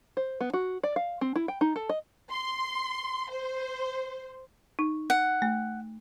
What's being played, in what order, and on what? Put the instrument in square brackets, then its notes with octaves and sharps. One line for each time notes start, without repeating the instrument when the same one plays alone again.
[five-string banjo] C5
B3
F#4
D5
F5
C4
E4
G5
D#4
A4
D#5
[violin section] C6
C5
[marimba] D#4
[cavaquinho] F#5
[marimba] A3